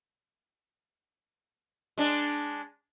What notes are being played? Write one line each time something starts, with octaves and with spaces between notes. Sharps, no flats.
G#3 D4